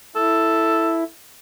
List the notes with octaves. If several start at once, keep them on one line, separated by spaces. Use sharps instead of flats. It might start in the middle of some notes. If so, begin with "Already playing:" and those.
E4 A4